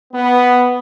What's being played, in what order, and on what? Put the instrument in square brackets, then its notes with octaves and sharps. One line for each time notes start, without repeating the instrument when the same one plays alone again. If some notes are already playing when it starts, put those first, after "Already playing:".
[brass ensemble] B3